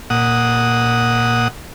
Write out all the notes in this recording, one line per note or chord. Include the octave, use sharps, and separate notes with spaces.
A#2 F#5 D#6